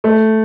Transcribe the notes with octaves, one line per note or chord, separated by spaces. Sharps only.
A3